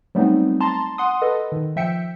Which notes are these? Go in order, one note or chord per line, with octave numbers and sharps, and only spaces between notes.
F#3 G3 A3 B3 C4 D#4
A5 A#5 C6
F#5 C6 D#6
A4 B4 D#5
D#3
F3 E5 G5 C#7